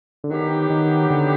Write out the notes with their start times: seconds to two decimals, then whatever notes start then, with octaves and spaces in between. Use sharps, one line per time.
0.24 D3
0.30 D#3 F#3 B3 D#4 G4
0.70 D#3
1.10 D3